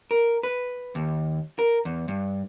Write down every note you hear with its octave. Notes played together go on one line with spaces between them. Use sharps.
A#4
B4
D#2
A#4
E2
G2